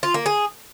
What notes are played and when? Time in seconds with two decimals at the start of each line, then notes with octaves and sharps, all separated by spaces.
0.03 F4
0.14 A#3
0.26 G#4